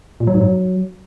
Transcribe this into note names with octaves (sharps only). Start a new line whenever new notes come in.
A#2
F#3
G#2
F#3